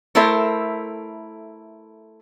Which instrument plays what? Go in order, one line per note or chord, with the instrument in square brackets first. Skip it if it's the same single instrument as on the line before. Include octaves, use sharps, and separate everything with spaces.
[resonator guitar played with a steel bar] A3 E4 A4 A#4 C5 E5